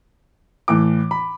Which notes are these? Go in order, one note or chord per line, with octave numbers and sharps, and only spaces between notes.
A2 E3 D6
B5